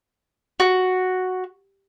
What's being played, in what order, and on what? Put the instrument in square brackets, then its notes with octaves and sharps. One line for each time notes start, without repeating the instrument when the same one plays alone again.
[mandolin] F#4